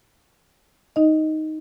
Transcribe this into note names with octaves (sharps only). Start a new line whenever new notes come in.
D#4 D#5